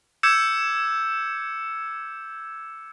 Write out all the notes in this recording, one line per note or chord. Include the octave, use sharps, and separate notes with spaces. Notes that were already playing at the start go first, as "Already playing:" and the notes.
D6 E6 G6 G#6 C#7 E7